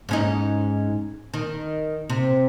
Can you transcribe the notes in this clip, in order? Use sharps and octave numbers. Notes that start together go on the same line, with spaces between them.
G#2 C#4 D#4
D#3
C3